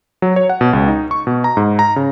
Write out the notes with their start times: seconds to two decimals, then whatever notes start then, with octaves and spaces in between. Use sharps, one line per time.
0.22 F#3
0.36 C#5
0.49 F#5
0.61 B2
0.73 C#2
0.88 D#4
1.11 C#6
1.27 B2
1.44 A#5
1.57 G#2
1.79 A#5
1.96 C#3